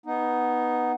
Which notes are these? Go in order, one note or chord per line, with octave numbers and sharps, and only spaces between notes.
B3 D#4